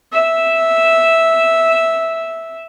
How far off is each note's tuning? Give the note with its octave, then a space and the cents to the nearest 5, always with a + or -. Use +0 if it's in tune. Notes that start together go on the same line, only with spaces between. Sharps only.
E5 -5